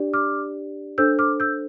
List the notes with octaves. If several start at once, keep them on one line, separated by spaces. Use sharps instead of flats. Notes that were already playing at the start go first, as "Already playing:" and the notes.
Already playing: D4 G4 D5
D6 F6
D4 A4 C5 E6 G6
D6 F6
E6 G6